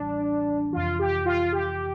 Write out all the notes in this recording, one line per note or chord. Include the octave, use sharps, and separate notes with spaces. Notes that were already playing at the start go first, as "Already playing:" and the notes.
Already playing: A1 A2 E3 G3 D4
F2 C3 E3 F4
G4
F4
G4